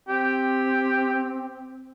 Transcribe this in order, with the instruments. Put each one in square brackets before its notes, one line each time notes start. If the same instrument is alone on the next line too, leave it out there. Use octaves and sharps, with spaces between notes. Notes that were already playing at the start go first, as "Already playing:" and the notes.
[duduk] C4 [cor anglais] G4